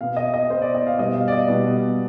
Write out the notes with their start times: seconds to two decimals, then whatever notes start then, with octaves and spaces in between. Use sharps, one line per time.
0.01 B2 B3 F5
0.17 D#5
0.34 D#5
0.50 B2 B3 C5
0.62 D5
0.75 D#5
0.87 F5
0.99 B2 G3 B3 D#5
1.15 F5
1.28 D5
1.32 D#5
1.48 B2 G3 B3